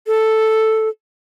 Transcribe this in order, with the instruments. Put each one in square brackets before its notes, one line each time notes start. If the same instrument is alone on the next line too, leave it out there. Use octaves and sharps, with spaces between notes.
[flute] A4